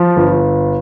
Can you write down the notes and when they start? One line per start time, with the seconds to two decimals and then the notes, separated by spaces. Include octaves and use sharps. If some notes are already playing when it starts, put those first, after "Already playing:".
Already playing: F3
0.17 G1